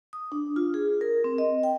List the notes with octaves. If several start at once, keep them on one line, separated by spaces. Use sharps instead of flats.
D#6
D4
F4
G#4
A#4
C4
D#5
G5